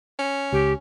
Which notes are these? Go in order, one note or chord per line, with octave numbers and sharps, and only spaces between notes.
C#4
C#2 G4